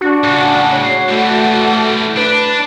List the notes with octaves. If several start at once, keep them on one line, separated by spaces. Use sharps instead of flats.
D4 F#4
A2 C#3 F#4
C#5
E3 G3 A3
D4 B4